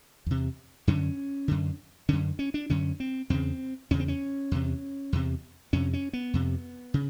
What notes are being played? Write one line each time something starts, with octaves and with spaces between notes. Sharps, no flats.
E2 C3
F#2 D3 C#4
F#2 D3
F#2 D3 C#4
C#4
D4
F#2 D3 C#4
C4
E2 C#3 C4
E2 C#3 C#4
C4
C#4
E2 C3
E2 C3
F2 C3 C#4
C#4
B3
F2 C3
C#3